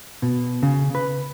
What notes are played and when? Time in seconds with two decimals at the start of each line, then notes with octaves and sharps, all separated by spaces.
0.22 B2
0.63 C#3
0.95 B4